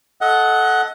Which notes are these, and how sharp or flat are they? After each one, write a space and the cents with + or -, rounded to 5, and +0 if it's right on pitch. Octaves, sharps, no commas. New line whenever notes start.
A4 -15 D#5 +25 F#5 +0